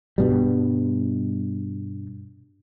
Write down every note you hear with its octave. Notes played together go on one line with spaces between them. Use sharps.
G2 B2 G3